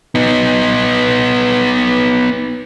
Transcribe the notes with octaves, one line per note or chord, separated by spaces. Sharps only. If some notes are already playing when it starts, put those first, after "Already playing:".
B3 D#4